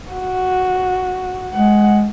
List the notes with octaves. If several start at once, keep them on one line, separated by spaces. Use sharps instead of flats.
F#4
G#3 F#5